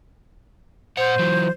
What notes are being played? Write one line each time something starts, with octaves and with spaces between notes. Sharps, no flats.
A#2 C5 F#5
E3 F#3